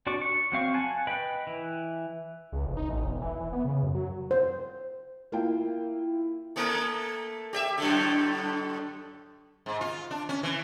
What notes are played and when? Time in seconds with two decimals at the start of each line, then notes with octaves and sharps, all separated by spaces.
0.07 D4 F#4 D5 C#6 D6
0.22 C#6
0.52 F#3 C4 F5 C#6
0.74 F#5 G#5 A5
1.07 B4 D#5 G5 B5
1.47 E3
2.52 C#2
2.66 F1
2.77 D#4
2.89 A1
3.04 E1
3.22 E3
3.40 E3
3.53 B3
3.65 C#3
3.83 F#2
3.95 F#3
4.31 C5
5.32 A#3 E4 F4 G5
6.56 A3 A#3 A#4
7.53 G4 D#5 E5
7.78 F#2 A2 D3
9.66 G#2
9.81 F4
10.11 D4
10.29 C#4
10.43 E3